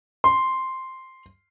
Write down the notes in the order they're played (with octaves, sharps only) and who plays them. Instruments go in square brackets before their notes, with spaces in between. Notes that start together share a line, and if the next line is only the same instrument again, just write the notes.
[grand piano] C6